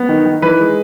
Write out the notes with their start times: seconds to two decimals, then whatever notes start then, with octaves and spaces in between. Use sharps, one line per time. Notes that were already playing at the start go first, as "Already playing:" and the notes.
Already playing: B3
0.09 D#3
0.26 D#3
0.42 E3 B4
0.60 G#3